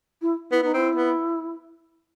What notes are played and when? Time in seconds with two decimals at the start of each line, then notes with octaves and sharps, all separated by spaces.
0.22 E4
0.51 B3 E4
0.62 B3 D#4
0.74 C4 E4
0.95 B3